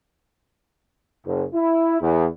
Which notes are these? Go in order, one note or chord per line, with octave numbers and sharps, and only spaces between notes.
F#1
E4
E2